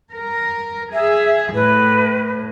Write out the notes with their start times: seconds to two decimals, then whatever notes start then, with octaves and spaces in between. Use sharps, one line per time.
0.11 A#4
0.93 G#4 E5
1.55 A2 B4